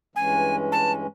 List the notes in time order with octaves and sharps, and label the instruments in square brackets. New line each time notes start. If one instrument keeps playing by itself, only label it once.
[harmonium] G2 E3 G#3 C#4 [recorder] G#5
[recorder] A5